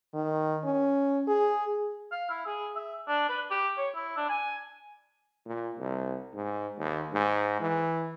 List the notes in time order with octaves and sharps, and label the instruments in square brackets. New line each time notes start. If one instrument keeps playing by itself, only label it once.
[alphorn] D#3
C#4
G#4
[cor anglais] F5
E4
G#4
E5
D4
B4
G4
C#5
E4
D4
G#5
[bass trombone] A#2
C2
G#2
D#2
G#2
E3